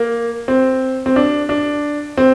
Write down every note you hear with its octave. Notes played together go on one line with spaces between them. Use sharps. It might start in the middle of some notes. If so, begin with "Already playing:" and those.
Already playing: A#3
C4
C4
D4
D4
C4